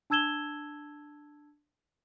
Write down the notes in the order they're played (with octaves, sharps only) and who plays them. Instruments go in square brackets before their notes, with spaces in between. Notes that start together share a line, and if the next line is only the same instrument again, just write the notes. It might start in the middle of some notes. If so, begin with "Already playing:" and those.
[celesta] D4 A5 E6 G#6 E7 G7